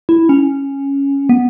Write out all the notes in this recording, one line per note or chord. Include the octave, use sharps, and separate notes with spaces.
E4
C#4
B3